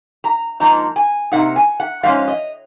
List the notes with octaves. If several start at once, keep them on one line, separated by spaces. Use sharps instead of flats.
A#5
G#2 F3 A#3 D#4 A#5
G#5
C3 F3 A#3 D#4 F#5
G#5
F#5
G#2 F3 C#4 F5
D#5